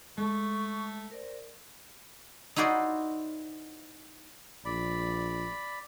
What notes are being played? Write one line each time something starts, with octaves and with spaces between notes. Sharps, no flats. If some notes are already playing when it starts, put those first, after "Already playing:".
G#3 A3 A4 A5 C#6
A#4 C5 D5
D#4 E4 F#4 C5 D5 D#5
A#1 D5 B5